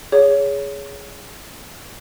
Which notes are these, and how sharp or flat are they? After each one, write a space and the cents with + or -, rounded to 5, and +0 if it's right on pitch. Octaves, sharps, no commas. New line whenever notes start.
G#4 +0 C#5 +20